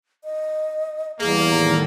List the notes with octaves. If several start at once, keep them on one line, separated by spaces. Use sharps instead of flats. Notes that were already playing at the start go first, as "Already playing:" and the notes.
D#5
E2 G3 A#3 G#4
A2 D#3 A4 A#5